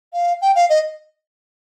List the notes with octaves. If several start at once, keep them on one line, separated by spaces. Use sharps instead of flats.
F5
G5
F5
D#5